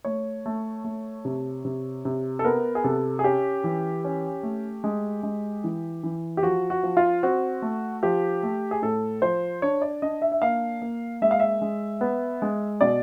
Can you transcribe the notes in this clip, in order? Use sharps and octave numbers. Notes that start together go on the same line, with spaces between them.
A3 C#5
A3
A3
C3
C3
C3
A4
B3 A#4
G#4
C3 A4
G#4
C#4 G4
E3
C#4
A3
G#3
G#3
E3
E3
G4
F3 F#4
F#4
F3
F4
C4 F#4
A3
F3 G4
A3
G#4
A2 A4
F3 C5
D4 C#5
D5
D4 D#5
E5
E5
A#3 F5
A#3
G#3 E5
F5
E5
G#3
B3
G#3
B2 D5